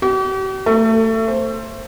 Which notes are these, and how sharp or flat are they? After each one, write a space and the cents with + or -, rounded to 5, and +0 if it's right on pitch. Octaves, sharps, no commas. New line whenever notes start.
G4 -45
A3 +25
C5 +10